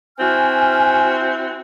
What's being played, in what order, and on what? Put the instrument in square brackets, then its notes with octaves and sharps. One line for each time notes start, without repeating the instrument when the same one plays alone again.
[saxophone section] C4 E4 F#4 [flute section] G#5 F6